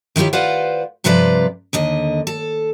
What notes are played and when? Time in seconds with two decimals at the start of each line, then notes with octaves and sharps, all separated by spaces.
0.16 D#3 E4 F4 G4 C#5
0.33 F4 B4 C5 D5 F5 F#5
1.04 G2 C3 F3 F4 B4 D5
1.73 D#2 D3 D#5
2.27 A4